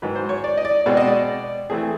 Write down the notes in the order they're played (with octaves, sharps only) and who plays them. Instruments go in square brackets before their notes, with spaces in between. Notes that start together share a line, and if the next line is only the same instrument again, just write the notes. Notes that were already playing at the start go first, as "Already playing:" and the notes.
[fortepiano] G#2 D#3 F#3 B4
C5
C#5
D5
D#5
D5
B2 G#3 C4 D5
D#5
D5
E3 A3 C4 G#4